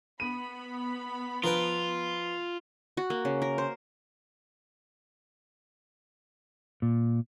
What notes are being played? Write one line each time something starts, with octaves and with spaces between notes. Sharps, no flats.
B3 B5 D#7
F3 F4 A#4 B4 G5
F#4
A#3
C#3
A#4
C5
A#2